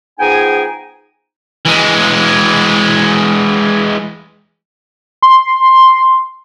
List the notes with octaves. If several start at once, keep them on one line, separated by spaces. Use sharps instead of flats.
F3 B3 D#4 G#4 G5 G#5
E3 G#3
C6